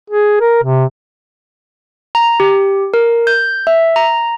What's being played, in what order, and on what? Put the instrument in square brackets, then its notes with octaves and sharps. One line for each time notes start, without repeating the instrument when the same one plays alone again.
[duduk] G#4
A#4
C3
[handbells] A#5
G4
A#4
G6
E5
A#5